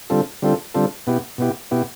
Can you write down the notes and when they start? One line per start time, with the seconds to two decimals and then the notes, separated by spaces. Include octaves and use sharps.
0.10 D3 G3 C4 F4 A4
0.42 D3 G3 C4 F4 A4
0.74 D3 G3 C4 F4 A4
1.07 B2 B3 E4 G4
1.38 B2 B3 E4 G4
1.71 B2 B3 E4 G4